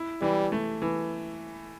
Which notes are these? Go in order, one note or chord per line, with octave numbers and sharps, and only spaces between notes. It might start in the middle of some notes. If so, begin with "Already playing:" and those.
Already playing: E4
E3 G3
A3
E3